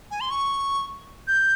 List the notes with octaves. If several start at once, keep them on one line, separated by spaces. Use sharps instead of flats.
G#5
C6
C#6
G6